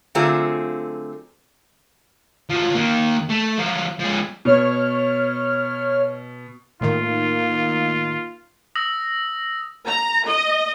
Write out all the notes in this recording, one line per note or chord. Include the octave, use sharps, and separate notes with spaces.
D3 F#3 A3 C4 F4 G#4
F3 F#3
D#3 A#3
A3
F3 F#3
F3 G#3
B2 C#5 F6
A2 D#3 A#3 D#4 F4
D#6 E6 A#6 F#7
A#5
D#5